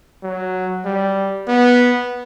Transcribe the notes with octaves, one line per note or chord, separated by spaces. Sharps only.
F#3
G3
B3